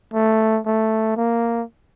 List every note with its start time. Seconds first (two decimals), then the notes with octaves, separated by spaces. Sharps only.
0.14 A3
0.66 A3
1.17 A#3